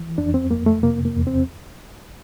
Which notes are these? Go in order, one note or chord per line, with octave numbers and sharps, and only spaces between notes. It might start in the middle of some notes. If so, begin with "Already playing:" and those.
Already playing: E3
F2 D4
C4
F2 A#3
A3
C3 A#3
A#3
E2
C4